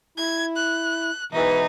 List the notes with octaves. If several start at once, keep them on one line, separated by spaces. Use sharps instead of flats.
E4 G#6
F#6
G#2 B2 E3 D#4